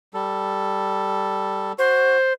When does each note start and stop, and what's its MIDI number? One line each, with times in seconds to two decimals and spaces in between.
0.14 1.72 55
0.14 1.72 69
1.78 2.17 66
1.78 2.33 72